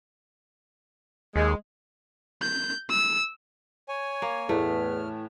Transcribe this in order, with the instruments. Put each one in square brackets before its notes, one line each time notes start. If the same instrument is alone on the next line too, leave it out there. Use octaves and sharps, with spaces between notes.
[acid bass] D#2 [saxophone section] G#3
[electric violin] G6
E6
[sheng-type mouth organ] C#5 G#5
[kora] A#3
[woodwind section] E2 [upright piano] A2 E3 [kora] A3 [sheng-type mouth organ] F6